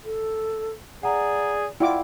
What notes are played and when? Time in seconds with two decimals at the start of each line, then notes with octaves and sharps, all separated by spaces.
0.05 A4
1.03 G#4 D5 F#5 A#5
1.80 E4 F4 D5 F#5 G5 D6